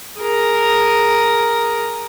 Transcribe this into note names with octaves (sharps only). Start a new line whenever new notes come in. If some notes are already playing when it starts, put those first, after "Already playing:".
G#4 A#4